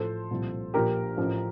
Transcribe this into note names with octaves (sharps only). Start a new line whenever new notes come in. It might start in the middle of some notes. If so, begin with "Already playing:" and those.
Already playing: A1 A2 F3 A4 C5
C2 A#2 F3
A#1 A#2 F3 G4 A#4
A1 A2 F3